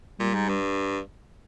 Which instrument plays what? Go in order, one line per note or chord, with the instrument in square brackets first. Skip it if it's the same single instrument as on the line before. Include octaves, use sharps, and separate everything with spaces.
[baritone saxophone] A#2 [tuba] G3
[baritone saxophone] G#2
G2